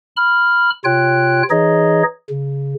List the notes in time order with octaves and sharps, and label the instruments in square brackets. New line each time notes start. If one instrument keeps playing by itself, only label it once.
[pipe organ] B5 F6
C3 F4 C#5 G5 F#6
E3 D#4 G#4 C#5 D#5
C#3